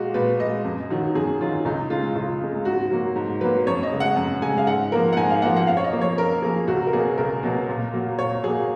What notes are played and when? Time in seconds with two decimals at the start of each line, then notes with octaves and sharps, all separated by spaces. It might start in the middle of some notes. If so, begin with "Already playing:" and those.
Already playing: A#2 G#3 F#4
0.14 A#2 B4
0.40 G#3 D#5
0.65 F#2
0.90 D#3 F#3
1.15 F#2 G#4
1.41 D#3 F#3 F4
1.65 C#2 D#4
1.90 C#3 G#3 F4
2.16 C#2 F4
2.41 C#3 G#3
2.65 G#2 F#4
2.91 F#3 A#3
3.16 G#2
3.41 F#3 A#3 B4
3.67 F#2 C#5
3.83 D#5
3.92 C#3 G#3
4.00 F#5
4.16 F#2
4.42 C#3 G#3 G#5
4.58 F5
4.67 G#2 F#5
4.92 F3 A#3 A#4
5.13 F#5
5.17 G#2 G#5
5.30 F5
5.42 F3 A#3 F#5
5.56 F#5
5.67 F#2 F5
5.77 C#5
5.84 D#5
5.92 F3 A#3
6.01 C#5
6.17 F#2 A#4
6.42 F3 A#3 G#4
6.68 C#2 F#4
6.87 A#4
6.93 B2 F#3 A#3 G#4
7.18 C#2 A#4
7.43 B2 F#3 A#3
7.69 A#2
7.93 F#3 A#3
8.19 A#2 C#5
8.44 F#3 A#3 G#4